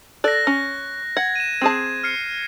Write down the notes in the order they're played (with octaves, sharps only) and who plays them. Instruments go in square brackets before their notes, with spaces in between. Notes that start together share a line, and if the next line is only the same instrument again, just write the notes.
[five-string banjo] A4 D5 [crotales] F#6 A#6
[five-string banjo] C#4
[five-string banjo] F#5 [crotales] G#6
[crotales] D#7 E7
[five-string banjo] C4 G#4 A5
[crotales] F6 C7 C#7